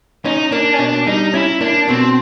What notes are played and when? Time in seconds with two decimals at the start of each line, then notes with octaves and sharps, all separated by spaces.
0.25 C#4 D#4
0.52 A#3 D4
0.73 C#4
0.79 B2 D4
1.07 G3 D#4
1.34 C#4 E4
1.61 A#3 D4
1.89 B2 C4